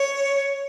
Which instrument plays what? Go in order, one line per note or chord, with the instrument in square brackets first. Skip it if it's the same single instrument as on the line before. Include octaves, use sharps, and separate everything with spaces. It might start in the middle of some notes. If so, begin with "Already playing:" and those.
Already playing: [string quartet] C#5